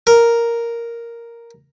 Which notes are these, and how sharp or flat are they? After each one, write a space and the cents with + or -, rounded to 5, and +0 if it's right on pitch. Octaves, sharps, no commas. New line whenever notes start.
A#4 +0